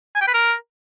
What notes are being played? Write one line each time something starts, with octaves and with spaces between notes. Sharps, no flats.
G#5
G5
B4
A#4